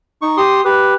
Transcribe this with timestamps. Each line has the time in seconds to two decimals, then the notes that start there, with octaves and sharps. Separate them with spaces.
0.22 D#4 C#6
0.37 G4 C6 D#6
0.65 G4 B4